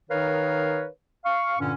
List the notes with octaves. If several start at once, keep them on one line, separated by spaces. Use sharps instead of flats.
D#3 D#4 A#4 B4 C#5 F5
F5 C#6
G2 A#2 D3 C#4